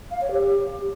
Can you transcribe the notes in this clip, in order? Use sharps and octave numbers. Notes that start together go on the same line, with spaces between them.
F5
C#5
G4